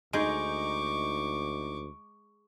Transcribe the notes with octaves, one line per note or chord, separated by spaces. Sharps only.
D2 G#3 D#4 C#6 D6 G6 D7